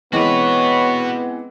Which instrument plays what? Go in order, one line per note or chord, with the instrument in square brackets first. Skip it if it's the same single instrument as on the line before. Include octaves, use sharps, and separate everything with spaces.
[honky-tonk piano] E3 G#3 C4 [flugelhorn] B3 [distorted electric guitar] F#4 B4 [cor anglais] C#5